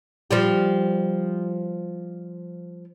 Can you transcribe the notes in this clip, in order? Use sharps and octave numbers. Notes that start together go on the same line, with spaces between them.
F3 G3 G4